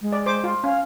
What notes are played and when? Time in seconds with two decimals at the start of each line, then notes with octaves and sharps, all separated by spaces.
0.01 G#3
0.12 D5
0.26 C5 D6
0.44 F4
0.64 C#4 F5